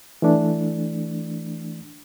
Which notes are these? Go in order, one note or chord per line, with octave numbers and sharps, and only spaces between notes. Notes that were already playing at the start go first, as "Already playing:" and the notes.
E3 A3 D4